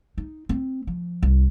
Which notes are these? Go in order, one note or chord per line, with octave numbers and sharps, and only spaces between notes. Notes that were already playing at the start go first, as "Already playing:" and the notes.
D#4
C4
F3
C2